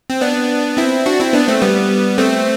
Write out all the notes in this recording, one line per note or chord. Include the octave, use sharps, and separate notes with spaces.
C4
B3 D4
C4 E4
D4 F#4
C4 E4
B3 D4
A3 C4
G3 B3
A3 C4